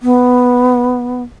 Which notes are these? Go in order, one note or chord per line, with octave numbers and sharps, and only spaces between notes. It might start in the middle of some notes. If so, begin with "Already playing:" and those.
B3